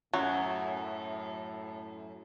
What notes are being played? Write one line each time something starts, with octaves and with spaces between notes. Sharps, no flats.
F#2 A2 F#3